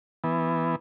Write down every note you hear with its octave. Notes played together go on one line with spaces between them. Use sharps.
E3 B3